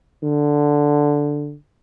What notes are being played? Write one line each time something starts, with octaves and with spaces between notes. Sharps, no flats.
D3